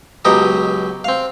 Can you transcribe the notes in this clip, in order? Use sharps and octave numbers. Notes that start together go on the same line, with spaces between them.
C#2 B2 F#3 G4 D#5 D#6
C4 F5